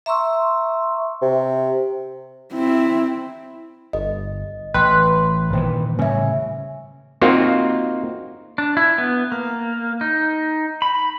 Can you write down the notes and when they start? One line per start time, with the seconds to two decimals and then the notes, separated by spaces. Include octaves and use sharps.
0.06 E5 A#5 C6 C#6 E6
1.22 C3
2.53 C4 E4
3.93 G1 D#5
4.74 A1 B4 G5 C6
5.53 A#2 D#3 E3 C5 G5
5.99 A2 C#3 G3 C#4 E5 G#5
7.22 A#3 C4 D#4 F4 F#4 A#4
8.58 D4
8.77 E4
8.98 B3
9.32 A#3
10.01 D#4
10.82 B5